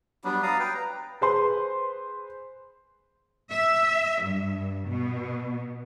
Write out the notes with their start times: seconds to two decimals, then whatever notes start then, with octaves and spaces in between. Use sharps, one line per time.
0.24 F#3 G3 B3 D4
0.43 D5 F5 A#5 D#6
0.59 B4 G5
0.75 A#5
1.21 G#4 B4 C5 C6
3.52 E5
4.23 G2
4.89 B2